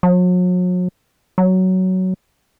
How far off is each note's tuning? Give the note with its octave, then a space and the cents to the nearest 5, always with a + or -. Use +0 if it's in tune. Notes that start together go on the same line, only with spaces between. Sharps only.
F#3 -40
F#3 +10